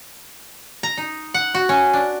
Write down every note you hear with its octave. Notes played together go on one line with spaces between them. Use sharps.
A#5
D#4
F#5
F#4
C#4
D4